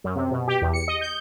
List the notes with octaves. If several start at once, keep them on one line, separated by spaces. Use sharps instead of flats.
F#2
C3
B2
G4
E2
C#7
D#5
G6